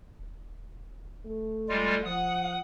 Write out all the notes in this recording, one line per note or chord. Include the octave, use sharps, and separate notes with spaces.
D#1
A3
G3 G#3 F4
F3 F#5 D#6